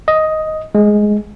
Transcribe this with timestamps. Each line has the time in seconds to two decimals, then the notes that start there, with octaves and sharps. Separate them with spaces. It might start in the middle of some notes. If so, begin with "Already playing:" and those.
0.08 D#5
0.75 G#3